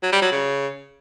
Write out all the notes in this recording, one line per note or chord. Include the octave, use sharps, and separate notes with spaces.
F#3
G3
F#3
C#3